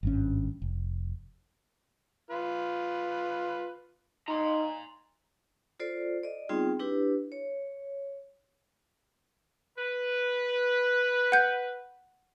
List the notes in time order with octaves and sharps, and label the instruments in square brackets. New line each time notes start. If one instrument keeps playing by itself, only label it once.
[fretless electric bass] G#1 G2 C#4
F1
[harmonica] F4 B4
[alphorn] D#4 [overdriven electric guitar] A#5 C6
[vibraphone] F4 A4 C5 D5
D5 D#5
G3 B3 C4 D#4 F4 G#4
D4 E4 G4 B4
C#5
[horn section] B4
[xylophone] F#5 G6